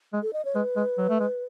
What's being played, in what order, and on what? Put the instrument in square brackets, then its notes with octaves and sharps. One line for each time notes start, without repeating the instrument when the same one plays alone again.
[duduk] G#3
[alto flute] A4
D#5
C#5
[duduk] G#3 [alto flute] B4
[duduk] G#3
F#3
A3
G#3